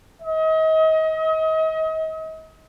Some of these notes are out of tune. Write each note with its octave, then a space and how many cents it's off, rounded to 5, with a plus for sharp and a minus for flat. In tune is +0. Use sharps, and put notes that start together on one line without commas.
D#5 +35